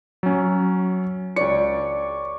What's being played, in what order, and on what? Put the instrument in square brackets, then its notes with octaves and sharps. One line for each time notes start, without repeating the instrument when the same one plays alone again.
[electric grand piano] F#3 C#4
[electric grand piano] C#2 C#7 [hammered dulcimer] B4 C#5 D5